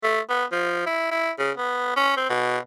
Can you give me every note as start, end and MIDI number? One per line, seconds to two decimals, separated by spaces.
0.03 0.20 57
0.29 0.45 59
0.52 0.86 53
0.86 1.08 64
1.11 1.31 64
1.39 1.51 49
1.57 1.94 59
1.96 2.12 61
2.17 2.26 60
2.29 2.58 47